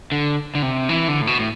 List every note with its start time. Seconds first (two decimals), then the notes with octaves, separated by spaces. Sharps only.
0.12 D3
0.55 D3
0.62 C3
0.89 E3
1.08 D3
1.21 A2
1.27 B2
1.40 A2